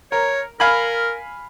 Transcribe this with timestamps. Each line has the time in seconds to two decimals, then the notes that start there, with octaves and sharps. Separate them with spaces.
0.12 A#4 C#5
0.60 A#4 F5 G#5 B5